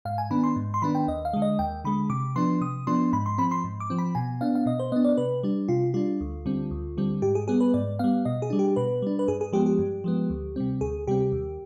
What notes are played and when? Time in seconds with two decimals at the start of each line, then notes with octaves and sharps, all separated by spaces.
0.05 G#2 F5
0.18 G#5
0.30 D#3 B3 D4 B5
0.44 C6
0.56 G#2
0.74 C6
0.82 D#3 B3 D4 B5
0.95 G5
1.08 D#2 D#5
1.25 F5
1.33 D3 G#3
1.42 D#5
1.59 D#2 G5
1.85 D3 G#3 B5
2.10 C3 D6
2.36 F3 B3 D4 C6
2.61 C3 D#6
2.87 F3 B3 D4 C6
3.13 G#2 B5
3.26 C6
3.38 F3 C4 B5
3.51 C6
3.64 G#2
3.80 D6
3.90 F3 C4
3.98 B5
4.15 B2 G#5
4.41 B3 D4 F5
4.55 F5
4.66 B2 D#5
4.79 C5
4.92 B3 D4 D#5
5.05 D5
5.17 C3 B4
5.43 G3 D4
5.68 C3 F4
5.94 G3 D4 F4
6.21 D2
6.46 D3 G3 C4
6.71 D2
6.97 D3 G3 C4
7.22 G#2 G4
7.35 G#4
7.48 G3 B3 G#4
7.60 B4
7.74 G#2 D5
7.99 G3 B3 F5
8.25 B2 D#5
8.42 G#4
8.50 G3 D4
8.59 G4
8.76 B2 B4
9.02 G3 D4
9.19 B4
9.28 G2 G#4
9.41 G#4
9.53 F3 G#3 B3 G4
9.66 G4
9.79 G2
10.04 F3 G#3 B3
10.30 D2
10.56 C3 G3 C4
10.81 D2 G#4
11.07 C3 G3 C4 G4
11.32 D#2